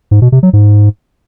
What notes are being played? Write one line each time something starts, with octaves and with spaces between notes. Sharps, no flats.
G#2
B2
C3
F#3
G#2